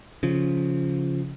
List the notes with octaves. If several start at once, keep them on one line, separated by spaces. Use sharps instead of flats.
C#3 F3